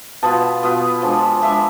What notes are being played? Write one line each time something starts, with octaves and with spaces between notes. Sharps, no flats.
B2 B3 F4 A5
B2 B3 F4
F3 G#3 D4
F3 G#3 D4 E5